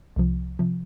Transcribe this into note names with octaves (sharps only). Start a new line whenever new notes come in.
C2 C3 F3
C3 F3